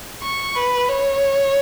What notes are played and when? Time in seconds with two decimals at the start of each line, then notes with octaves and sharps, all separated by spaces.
0.22 C#6
0.55 B4
0.89 C#5